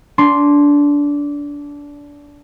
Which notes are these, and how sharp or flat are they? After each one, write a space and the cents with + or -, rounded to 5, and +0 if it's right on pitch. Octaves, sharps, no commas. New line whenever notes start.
D4 -20 C6 +0